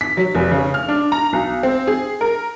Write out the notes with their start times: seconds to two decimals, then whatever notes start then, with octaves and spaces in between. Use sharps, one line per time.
0.01 B6
0.17 F#3
0.35 F1
0.51 C#3
0.74 F6
0.89 D4
1.12 A#5
1.33 B1
1.63 C4
1.87 G#4
2.21 A#4